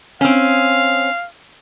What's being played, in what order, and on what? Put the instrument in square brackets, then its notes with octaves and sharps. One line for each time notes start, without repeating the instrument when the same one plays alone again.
[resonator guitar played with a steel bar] C4 C#4 [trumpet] F5